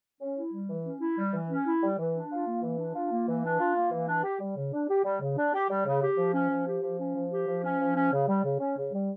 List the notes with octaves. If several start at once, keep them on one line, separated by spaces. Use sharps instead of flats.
C#4
E4
G3
E3
C#4
E4
G3
E3
C#4
E4
G3
E3
D4
F4
A#3
E3
D4
F4
A#3
E3
D4
F4
A#3
E3
D4
G4
G3
C#3
D4
G4
G3
C#3
D4
G4
G3
C#3
G4
F3
C#4
F3
G4
F3
C#4
F3
G4
F3
C#4
F3
C#4
C#3
G3
C#3
C#4
C#3
G3